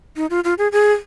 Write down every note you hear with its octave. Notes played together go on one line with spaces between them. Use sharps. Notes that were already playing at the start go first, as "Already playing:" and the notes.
D#4
F4
F4
G#4
G#4